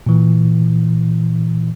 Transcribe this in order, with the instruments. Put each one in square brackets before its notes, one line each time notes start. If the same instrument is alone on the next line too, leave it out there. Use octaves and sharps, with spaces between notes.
[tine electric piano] A#2 E3